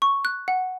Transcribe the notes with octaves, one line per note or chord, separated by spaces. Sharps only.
C#6
F#6
F#5